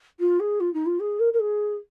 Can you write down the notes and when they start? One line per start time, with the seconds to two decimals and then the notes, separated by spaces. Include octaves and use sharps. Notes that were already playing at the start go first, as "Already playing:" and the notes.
0.20 F4
0.40 G#4
0.60 F4
0.74 D#4
0.86 F4
1.00 G#4
1.20 A#4
1.33 A#4
1.40 G#4